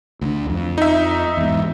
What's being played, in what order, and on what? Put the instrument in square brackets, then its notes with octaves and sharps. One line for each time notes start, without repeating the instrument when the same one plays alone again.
[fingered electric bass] D2 D3
F2
[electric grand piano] D#4 E5
[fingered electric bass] E2 G#2